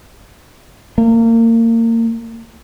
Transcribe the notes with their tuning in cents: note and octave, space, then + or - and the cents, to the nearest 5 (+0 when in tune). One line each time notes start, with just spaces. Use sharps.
A#3 -30